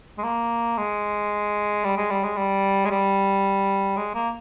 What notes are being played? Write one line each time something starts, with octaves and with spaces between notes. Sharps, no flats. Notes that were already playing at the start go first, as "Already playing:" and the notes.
G#3
A#3
G#3
G3
G#3
G3
G#3
G3
G#3
G3
G#3
A#3